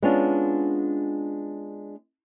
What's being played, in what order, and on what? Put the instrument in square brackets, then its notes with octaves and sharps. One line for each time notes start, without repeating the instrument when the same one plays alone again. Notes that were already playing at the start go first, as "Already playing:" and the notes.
[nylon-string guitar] G#3 B3 C#4 D4 F4